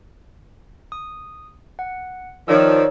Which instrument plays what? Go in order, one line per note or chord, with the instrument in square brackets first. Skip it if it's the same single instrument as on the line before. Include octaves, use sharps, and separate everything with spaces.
[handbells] D#6
F#5
[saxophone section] D#3 F3 [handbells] C#5 D5 E6